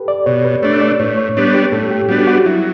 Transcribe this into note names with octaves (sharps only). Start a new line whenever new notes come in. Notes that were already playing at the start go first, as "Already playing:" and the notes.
Already playing: G4 A4 B4
D5
B2 C#5
B4
A3 D4 C#5
D5
A2 C#5
C#5
G3 B3 D4 C#5
G4
A2 A4
G4
G3 B3 D4 F#4
F#4
F#3 E4